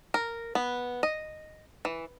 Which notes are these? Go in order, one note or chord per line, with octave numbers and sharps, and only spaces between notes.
A#4
B3
D#5
E3